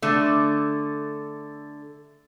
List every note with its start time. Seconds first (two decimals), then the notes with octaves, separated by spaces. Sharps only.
0.02 D3 A3